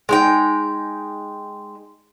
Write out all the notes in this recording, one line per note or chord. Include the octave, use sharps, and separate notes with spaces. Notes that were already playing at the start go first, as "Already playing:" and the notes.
G#3 D#4 G5